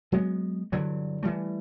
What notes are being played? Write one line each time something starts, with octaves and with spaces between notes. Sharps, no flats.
F#3 G#3 B3
G2 D3 E3 F#3
E3 G3 A3